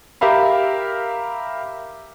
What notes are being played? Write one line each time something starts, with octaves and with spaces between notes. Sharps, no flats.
G4 A#4 E5 F5 B5